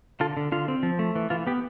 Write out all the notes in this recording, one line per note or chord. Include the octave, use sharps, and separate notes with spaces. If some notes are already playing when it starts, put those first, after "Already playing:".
D3 F4 A4
D3
D3 F4
C4
F3
A3
E3
E3 F4
B3 G4